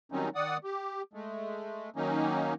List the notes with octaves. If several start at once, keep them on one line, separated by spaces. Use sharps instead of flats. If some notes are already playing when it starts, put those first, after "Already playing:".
D#3 F#3 G3 C4 C#4 D#4
D#3 D5 F#5 D#6
G4
G#3 A3
D#3 F#3 A#3 C#4 D#4